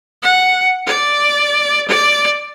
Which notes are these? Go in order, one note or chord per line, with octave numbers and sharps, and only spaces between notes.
F#5
D5
D5